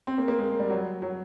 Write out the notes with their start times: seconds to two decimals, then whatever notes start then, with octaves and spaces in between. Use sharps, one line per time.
0.07 C4
0.18 A#3
0.28 A#3
0.38 G#3
0.49 G#3
0.60 G3
0.70 F#3
1.02 F#3